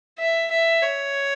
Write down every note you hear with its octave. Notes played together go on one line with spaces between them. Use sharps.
E5
E5
C#5